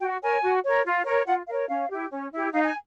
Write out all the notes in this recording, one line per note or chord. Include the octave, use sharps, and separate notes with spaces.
F#4 G5
A#4 C#5 G#5
F#4
A#4 C#5
F4
A#4 C#5
F4 F#5
A#4 C#5 F5
C#4 F5
E4 G4
C#4
E4 G4
D#4 F5
G#5